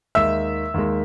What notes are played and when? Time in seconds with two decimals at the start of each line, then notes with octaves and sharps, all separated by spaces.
0.15 D#2 D#3 G#3 E5 E6
0.74 D#2 D#3 G#3